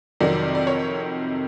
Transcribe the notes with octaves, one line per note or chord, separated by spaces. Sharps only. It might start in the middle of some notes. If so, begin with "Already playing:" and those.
F2 C3 D#3 F#3 D5
D5
C#5